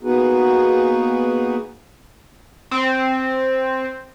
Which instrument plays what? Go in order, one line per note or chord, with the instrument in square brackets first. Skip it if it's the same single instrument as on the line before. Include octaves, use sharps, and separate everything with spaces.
[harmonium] A#3 B3 D#4 F#4 G#4 B4
[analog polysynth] C4